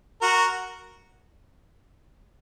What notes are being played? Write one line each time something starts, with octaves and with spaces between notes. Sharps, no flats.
F#4 A#4